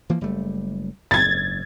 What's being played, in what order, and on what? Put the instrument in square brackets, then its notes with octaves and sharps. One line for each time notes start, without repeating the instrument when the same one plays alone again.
[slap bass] E3 F3 A#3
F#1 G3 A3
[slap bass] F#1 G#2 [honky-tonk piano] G#6 A6